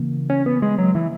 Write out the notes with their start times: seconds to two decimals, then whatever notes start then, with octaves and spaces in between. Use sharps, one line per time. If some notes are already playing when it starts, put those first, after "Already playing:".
Already playing: C#3 E3 A#3
0.30 C#4
0.46 B3
0.62 G#3
0.78 F#3
0.95 E3